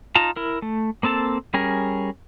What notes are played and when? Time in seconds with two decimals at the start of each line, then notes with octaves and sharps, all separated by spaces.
0.15 D#4 F4 A5 A#5
0.36 E4 A#4
0.62 A3
1.03 A#3 C4 A4 A5
1.54 G3 C#4 G#4 A#4